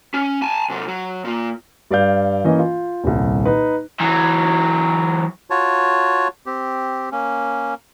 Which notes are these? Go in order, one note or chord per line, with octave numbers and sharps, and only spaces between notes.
C#4
G#5 A5
C3 F#3
F#3
A#2 A#3
G2 D5 F5 G6
E3 A#3 C#4 D#5
F4
D#1 C2
D#4 B4
E3 F#3
F4 F#4 C#5 A5
C4 G4
A#3 C#4